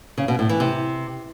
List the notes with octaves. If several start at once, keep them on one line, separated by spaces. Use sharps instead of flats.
C#3
B2
A2
E3
C3